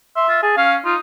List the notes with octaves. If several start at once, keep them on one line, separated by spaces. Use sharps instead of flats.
E5 C6
F4
G#4 A5
C#4 F5
D#4 F4